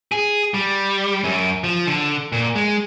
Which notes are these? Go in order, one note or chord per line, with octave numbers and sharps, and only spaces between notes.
G#4
G3
F#2
F3
D3
A#2
G#3